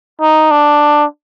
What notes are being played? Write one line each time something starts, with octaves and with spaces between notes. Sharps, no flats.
D#4
D4